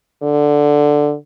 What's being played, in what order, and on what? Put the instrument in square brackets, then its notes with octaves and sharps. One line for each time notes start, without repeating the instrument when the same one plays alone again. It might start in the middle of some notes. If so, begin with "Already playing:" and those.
[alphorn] D3